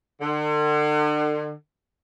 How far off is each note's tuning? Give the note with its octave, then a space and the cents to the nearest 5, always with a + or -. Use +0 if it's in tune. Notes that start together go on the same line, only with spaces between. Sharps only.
D3 +40